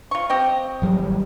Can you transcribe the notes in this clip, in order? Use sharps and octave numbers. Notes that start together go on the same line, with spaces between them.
F4 C#6
C4 G4 D#5
G#1 F#3 G3